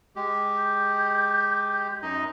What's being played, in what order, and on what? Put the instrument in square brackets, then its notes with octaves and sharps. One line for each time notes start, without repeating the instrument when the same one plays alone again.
[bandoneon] G#3 G4
[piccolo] G6
[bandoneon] F#2 D#4 D#5